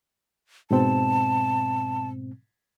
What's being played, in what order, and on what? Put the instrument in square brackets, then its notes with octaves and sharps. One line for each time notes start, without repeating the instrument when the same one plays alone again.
[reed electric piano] G#2 B2 C4 [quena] A5